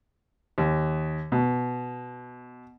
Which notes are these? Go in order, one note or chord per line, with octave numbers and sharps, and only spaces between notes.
D#2
B2